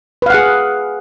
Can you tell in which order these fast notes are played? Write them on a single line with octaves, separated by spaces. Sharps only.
B4 F5 F#5 G#4